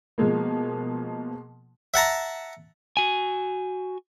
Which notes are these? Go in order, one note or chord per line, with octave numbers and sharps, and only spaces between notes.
B2 F3 G#3 A#3
E5 F#5 A5 A#5
F#4 G#5